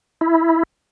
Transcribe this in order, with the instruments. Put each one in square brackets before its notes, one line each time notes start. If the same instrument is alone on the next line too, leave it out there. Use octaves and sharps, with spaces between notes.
[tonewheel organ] E4